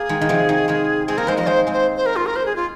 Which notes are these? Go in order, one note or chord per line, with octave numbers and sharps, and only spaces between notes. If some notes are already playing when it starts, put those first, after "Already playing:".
Already playing: A#3 G#4
D#3 G#3
D#3
C3 F3
D#3
D#3 G#3
G#3 C4 G#4
A#3 D#4 A#4
G#3 C4 C5
F3 A#3 D#5
D#3 G#3 C5
G#3 C4
C5
C5
A#4
F4
A#4
C5
G#4
F4